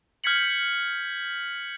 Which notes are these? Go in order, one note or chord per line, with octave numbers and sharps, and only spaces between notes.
F6 G6 G#6 B6 C#7 F#7